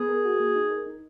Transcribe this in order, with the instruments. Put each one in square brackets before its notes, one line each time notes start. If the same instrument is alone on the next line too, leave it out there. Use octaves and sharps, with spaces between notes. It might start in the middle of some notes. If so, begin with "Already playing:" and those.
Already playing: [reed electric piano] B3 [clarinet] G#4
[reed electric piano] A#4
F#4
A#3
D#4
A#4
D#4